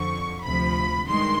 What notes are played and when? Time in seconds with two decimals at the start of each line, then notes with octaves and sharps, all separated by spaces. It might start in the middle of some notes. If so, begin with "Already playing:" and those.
Already playing: F2 D3 F3 C#6
0.44 D2 C3 F3 B5
1.08 G2 D#3 G#3 C6